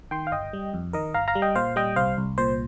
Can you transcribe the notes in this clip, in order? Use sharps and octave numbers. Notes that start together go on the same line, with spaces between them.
D#3 G5 C6
F5
G1 D#5 G5
G3
F2
D#3 A#4 D#5
G1 F5 A#5
F5 A#5
G3
D#5 G5
A#2 C5 F5
G3 D#5 G5
C2 C5 F5
C2
A#2 C5